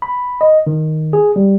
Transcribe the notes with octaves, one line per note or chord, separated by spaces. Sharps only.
B5
D#5
D#3
G#4
G3